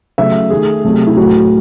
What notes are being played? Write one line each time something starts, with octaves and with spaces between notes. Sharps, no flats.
C#3 F#3 A3 E5
D#3 A3 G#4
C3 F#3 A3
E4
A2 F#3 A3 F#4